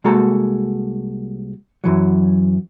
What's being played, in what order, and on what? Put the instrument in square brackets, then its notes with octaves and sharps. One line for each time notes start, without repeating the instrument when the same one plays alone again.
[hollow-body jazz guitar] C2 G#3 A#3 F#4 A4 A#5
F#2 E3 F#3